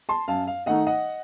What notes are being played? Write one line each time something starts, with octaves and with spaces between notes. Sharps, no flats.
A5 C6
F#2 F5 A5
F5
D#3 A3 D#4 D#5 F#5
D#5 F#5